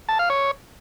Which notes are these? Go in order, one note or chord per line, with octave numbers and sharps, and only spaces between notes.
A5
F5
C#5